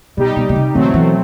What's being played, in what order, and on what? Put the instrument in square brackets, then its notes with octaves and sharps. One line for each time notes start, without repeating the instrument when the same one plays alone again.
[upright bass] B2 [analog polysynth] G3 D#4 G4
[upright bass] B2
B2
C3
[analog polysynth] B2 F#3 A3 C4 [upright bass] D#3
[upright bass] D#3
E3